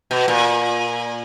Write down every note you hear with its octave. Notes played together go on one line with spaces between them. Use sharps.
B2
A#2